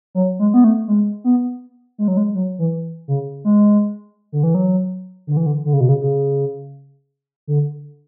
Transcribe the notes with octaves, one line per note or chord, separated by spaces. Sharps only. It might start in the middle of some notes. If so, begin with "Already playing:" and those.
F#3
G#3
B3
A3
G#3
B3
G#3
F#3
G#3
F#3
E3
C#3
G#3
D3
E3
F#3
D3
E3
D3
D3
C#3
B2
C#3
C#3
D3